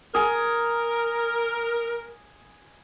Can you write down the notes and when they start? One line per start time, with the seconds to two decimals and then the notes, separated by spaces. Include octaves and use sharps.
0.15 G#4 A#4